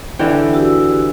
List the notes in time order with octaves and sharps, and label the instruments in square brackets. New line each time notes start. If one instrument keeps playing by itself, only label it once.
[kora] D3 E3 G5
[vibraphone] F#4 G4 E6